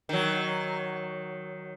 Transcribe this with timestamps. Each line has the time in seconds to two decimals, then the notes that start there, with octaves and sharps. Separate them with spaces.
0.09 D#3 F#3